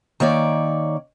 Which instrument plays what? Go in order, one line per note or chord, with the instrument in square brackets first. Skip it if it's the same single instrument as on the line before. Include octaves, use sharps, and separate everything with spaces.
[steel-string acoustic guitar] D#3 A#3 C#5 D5